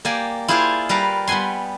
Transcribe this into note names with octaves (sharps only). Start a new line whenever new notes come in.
A#3 G4 D5 G#5
E4 F4 G#4 C5 D5 F5
G3 A#4 B4 F5
G3 B3 F#5 G#5 C6